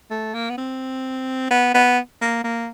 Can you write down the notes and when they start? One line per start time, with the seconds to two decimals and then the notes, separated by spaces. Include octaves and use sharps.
0.11 A3
0.34 A#3
0.50 B3
0.57 C4
1.50 B3
1.74 B3
2.21 A#3
2.44 A#3